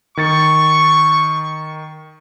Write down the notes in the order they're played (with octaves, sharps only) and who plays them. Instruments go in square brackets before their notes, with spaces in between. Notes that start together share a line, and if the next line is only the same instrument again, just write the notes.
[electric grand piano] D#3 A6 C#7 [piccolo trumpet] C#6